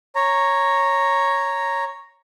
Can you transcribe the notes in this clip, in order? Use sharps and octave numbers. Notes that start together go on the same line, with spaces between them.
C#5 A#5